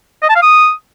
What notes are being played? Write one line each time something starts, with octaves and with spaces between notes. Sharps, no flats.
D#5
A5
F5
D#6